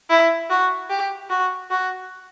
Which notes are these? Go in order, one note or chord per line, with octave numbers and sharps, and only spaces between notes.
E4
F#4
G4
F#4
F#4